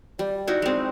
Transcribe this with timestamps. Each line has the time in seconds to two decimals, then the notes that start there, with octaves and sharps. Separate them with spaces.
0.19 G3 D5
0.47 D#4 E4 F#4
0.62 G#3 C4